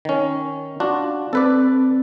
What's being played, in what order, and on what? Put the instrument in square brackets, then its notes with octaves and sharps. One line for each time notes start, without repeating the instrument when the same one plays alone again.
[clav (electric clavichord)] D#3 C#4
D4 F4 F#4
[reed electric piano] C4 [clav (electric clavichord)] A4 B4 D5